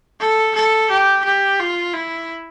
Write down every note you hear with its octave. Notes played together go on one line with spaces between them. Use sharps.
A4
A4
G4
G4
F4
E4